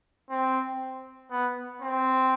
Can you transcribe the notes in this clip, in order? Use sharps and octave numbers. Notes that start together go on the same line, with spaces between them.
C4
B3
C4